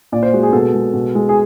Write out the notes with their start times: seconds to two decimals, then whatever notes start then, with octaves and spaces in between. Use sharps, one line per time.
0.12 A#2 D5
0.23 C5
0.33 G#3 F#4
0.43 G#4
0.53 B2 A4
0.74 G#3
0.94 B2
1.15 G#3
1.29 G#4